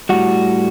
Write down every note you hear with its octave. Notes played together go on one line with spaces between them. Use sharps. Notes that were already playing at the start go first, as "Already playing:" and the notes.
A2 G3 F#4